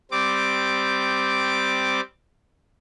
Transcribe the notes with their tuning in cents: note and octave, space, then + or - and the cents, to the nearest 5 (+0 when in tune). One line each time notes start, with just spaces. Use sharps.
G3 +0 C4 -10 D6 +0